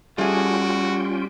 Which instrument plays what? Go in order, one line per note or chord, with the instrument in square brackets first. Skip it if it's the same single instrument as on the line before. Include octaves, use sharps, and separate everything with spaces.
[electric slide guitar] G3 [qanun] A3 G#4 [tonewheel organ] C#4 F4 G5 [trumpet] F#4